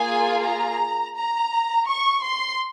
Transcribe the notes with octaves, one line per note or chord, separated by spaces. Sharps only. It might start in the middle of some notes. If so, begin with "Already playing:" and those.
Already playing: A#3 F4 G#4 G#5
A#5
A#5
C#6
C6